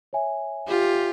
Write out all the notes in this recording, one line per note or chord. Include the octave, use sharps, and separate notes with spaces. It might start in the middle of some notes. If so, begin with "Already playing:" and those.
C#5 E5 G#5
F4 G4